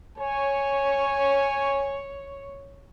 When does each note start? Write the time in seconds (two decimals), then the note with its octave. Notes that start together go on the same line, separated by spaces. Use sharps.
0.18 C#5 G#5